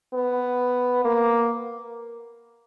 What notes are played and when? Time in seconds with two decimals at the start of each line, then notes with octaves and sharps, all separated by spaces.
0.14 B3
1.05 A#3